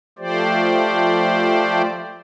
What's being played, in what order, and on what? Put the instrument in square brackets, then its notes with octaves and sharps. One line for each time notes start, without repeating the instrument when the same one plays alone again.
[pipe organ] F3 A3 G4 C5 D5